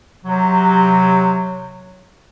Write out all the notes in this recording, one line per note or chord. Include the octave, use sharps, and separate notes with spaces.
C3 F#3